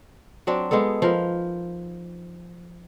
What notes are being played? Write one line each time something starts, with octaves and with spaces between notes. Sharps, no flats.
F#3 C4 D4
G#3 B3 D#4 A4
F3 A#4 B4